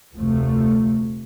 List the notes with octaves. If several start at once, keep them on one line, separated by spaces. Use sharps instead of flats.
F1 D2 C3 F3 A3